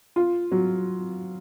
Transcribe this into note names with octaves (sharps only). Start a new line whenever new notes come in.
F4
F#3